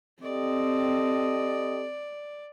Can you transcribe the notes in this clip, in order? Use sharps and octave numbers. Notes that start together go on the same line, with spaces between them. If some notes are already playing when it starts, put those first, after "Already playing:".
C4 G4 A4 D5 D#5